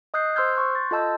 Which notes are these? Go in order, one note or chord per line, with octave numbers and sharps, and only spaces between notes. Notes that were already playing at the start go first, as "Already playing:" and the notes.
D#5 D#6 F#6 G6 C7
C5 C6 E6 F6 G6 G#6
C6 C#6 F#6 G6
A6
F4 A4 D#5 A5 E6 G6